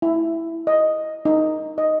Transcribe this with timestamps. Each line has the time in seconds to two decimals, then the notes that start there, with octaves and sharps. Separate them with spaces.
0.02 E4
0.67 D#5
1.25 D#4
1.78 D#5